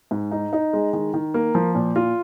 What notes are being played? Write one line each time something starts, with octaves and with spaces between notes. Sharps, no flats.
G#2
D#4
D#4
G#3
D#3
D#3
A#3
F3
A#2
F4